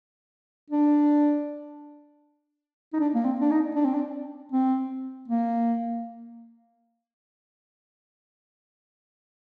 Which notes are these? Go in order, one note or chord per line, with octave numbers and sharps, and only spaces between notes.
D4
D#4
D4
A#3
C4
D4
D#4
D4
C4
D4
C4
A#3